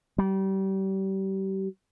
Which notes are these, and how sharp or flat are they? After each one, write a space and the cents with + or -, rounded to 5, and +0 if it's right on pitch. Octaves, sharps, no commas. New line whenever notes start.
G3 -30